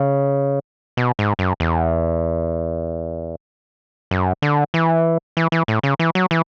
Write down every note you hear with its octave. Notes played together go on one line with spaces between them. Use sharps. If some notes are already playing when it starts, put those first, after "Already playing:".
Already playing: C#3
B2
G#2
F#2
E2
F#2
D3
E3
E3
E3
A2
C#3
E3
F#3
E3